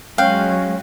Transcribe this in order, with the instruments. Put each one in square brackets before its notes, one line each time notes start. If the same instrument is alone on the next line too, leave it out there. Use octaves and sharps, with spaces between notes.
[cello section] F#3 G#3 [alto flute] C#4 [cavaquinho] F5 [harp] G5 F#6